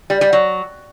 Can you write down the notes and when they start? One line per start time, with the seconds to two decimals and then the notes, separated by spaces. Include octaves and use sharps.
0.10 G3
0.21 G3
0.33 F#3